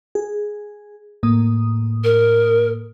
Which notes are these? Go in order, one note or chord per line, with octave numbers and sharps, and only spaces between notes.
G#4
A2 A#3 D#6
A#4